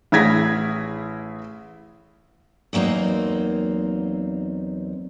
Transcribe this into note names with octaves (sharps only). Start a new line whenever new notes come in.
A1 E4 G#4 G#6 A#6 B6
E2 F#3 A#3 C4 D#4